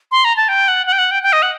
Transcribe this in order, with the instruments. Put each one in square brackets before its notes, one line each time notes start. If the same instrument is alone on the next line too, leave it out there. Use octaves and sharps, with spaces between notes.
[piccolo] C6
A#5
A5
G5
F#5
F#5
G5
F#5
G5
G5
D#5
F#5